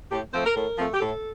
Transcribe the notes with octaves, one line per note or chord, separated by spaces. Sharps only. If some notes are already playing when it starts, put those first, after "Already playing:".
A2 G4
F3 A3 C4 C5
A#4
A2 A#4
F3 A3 C4
G4
A2 A4